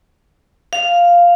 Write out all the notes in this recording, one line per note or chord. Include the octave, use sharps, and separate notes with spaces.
F5